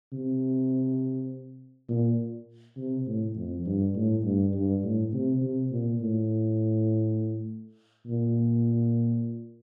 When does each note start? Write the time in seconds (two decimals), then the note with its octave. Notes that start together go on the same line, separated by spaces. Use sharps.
0.12 C3
1.89 A#2
2.77 C3
3.07 A2
3.36 F2
3.66 G2
3.95 A2
4.25 G2
4.54 G2
4.83 A2
5.13 C3
5.42 C3
5.71 A#2
6.01 A2
8.07 A#2